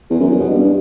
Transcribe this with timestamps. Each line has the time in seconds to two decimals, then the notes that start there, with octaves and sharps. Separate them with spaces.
0.10 E2
0.20 F#2
0.30 E2
0.39 B2
0.49 G2